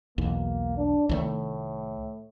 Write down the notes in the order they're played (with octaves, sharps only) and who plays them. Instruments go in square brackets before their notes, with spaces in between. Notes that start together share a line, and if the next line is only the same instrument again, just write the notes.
[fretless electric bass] B1 E2 [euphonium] A#3
[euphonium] D4
[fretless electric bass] C2 D#3 A3 [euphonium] A2